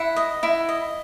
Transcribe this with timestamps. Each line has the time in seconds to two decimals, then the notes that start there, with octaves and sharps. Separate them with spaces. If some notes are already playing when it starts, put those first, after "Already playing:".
Already playing: E4 F#5
0.16 D#5
0.43 E4
0.69 D#5